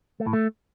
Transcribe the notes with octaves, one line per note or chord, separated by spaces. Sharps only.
A3
A2
A3